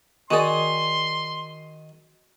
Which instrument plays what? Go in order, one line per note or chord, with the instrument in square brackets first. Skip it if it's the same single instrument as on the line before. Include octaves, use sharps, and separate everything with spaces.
[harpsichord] D#3 D#4 [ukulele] F#4 G#4 D5 [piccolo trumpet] C6